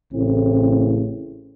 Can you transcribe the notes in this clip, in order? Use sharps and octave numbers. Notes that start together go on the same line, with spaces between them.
A1 A2 C#3 C4 E4